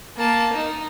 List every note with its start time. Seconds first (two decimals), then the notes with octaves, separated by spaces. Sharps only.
0.17 A#3 A5
0.53 D#4